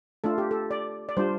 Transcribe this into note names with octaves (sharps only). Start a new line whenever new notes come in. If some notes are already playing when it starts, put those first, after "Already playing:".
A3 D4 F4 A4
G4
A4
D5
D5
G3 D4 F4 C5